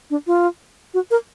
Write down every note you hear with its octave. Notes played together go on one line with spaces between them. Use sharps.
D4
F4
F#4
A#4